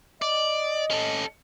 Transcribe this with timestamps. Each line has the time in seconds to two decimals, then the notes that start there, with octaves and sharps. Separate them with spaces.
0.22 D5 D#5
0.91 C#4 A4